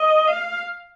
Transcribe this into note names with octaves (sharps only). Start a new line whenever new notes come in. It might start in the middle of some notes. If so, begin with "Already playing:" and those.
Already playing: D#5
F5